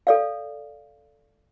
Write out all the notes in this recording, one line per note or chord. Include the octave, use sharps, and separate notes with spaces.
A4 D5 F5